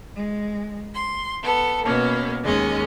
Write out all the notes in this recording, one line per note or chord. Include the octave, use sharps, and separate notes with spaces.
G#3
C6
B3 A4
B2 A#3 B3 C#4
D#2 G#3 C#4 D#5